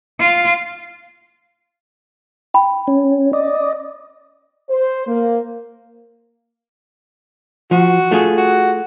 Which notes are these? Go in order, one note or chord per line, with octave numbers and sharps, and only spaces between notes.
F4
G5 B5
C#4
D5 D#5
C5
A#3
F3 F#4
A3 F4 G#4
F#4